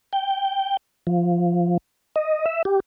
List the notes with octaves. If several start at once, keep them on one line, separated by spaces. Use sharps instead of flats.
G5
F3
D#5
E5
G4